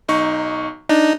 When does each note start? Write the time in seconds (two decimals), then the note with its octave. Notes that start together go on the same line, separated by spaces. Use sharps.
0.08 B1 D#4 C#6
0.89 D4 D#4